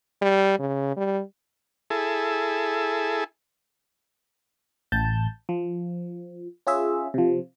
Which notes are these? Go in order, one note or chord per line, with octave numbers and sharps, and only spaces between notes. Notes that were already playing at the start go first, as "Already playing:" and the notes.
G3
C#3
G3
E4 G#4 A4
A1 A5 G6
F3
C#4 F4 G#4 E5
C3 F3